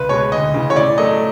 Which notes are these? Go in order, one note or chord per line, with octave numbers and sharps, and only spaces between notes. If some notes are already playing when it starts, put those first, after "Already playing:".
Already playing: C#2 B4
B2 G#3 C#5
D2 D#5
C#3 E3
C#5
A2 D5
F#3 A3 D#5